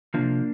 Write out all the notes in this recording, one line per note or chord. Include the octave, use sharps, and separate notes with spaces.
C3 F3 A#3 D4